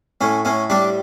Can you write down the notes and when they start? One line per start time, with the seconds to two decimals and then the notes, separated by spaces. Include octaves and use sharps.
0.21 A2 C#4
0.45 A2 C#4
0.70 G3 D4